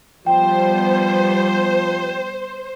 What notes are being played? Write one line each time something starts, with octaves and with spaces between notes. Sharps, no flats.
F3 G3 B3 C5 G5